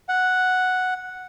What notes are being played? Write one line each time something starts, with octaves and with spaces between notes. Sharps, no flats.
F#5